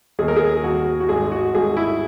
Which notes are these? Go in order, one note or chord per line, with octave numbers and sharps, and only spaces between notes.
D#2 G#4
A#4
G#4
D#2 F#4
F#4
G#1 G#4
F#4
G#1 G#4
E4